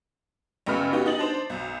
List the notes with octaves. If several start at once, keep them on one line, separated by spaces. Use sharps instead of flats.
A1 F#2 C#3 B3 B5 F6
B3 D#4 F#4 G4
B3 D#4 D#5 A6 F#7
D4 C5
B1